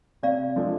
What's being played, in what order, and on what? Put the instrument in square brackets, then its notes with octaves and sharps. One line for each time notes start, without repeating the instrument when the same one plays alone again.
[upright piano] C3 [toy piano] D5 F5
[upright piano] F3 G#3 D4 A4